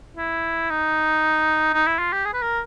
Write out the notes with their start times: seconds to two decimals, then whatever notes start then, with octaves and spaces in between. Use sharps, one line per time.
0.17 E4
0.70 D#4
1.74 D#4
1.87 E4
1.99 F4
2.13 G4
2.25 G#4
2.33 B4
2.42 A#4